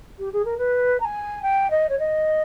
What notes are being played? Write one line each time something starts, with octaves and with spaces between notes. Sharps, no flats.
G4
G#4
A#4
B4
A#5
G#5
G5
D#5
C#5
D#5